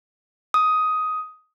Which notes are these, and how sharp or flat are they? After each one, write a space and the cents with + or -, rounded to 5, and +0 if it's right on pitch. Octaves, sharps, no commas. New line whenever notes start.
D#6 +10